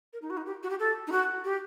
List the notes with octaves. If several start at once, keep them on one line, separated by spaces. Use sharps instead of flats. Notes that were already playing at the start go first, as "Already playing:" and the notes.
A#4
D#4
F#4
D#4
G4
F#4
G4
A4
D#4
F#4
G4